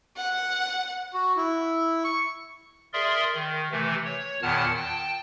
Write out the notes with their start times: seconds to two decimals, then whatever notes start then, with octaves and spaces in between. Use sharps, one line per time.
0.17 F#5
1.14 F#4
1.37 E4
2.04 C#6
2.93 G#4 A#4 D5 E5 C6
3.35 D#3
3.72 C3 E3 A3
4.05 C#5
4.42 E2 A#2 D#3 F#5 A5 F6
4.77 G5 A5